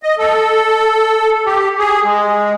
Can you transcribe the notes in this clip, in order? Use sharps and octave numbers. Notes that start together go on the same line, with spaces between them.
D#5
A4
G4
G#4
G#3